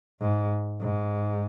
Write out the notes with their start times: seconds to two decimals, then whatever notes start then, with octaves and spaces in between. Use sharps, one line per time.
0.21 G#2
0.81 G#2